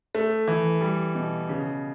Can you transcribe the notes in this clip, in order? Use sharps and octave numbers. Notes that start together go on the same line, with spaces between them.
A3
E3
G3
B2
C#3